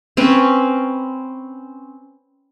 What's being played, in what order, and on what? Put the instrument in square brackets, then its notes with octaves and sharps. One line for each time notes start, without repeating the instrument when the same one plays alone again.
[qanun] C4 C#4 B4